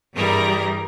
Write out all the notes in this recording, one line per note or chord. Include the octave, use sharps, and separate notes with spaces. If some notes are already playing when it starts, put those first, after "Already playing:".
G2 E3 G3 G#4 A#4 A#5